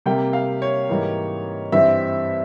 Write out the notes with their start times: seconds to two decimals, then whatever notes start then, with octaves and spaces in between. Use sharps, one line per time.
0.06 C3 G3 A#3 G5
0.33 F5
0.62 C#5
0.89 G#2 E3 G3 A#3
1.72 G2 E3 G3 C4 E5